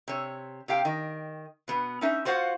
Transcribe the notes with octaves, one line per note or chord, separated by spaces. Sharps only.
C3 C#5
C3 G4 F5 G5
D#3 D#5
B2 B3
C#4 D#4 E5
F4 F#4 C5 F5 F#5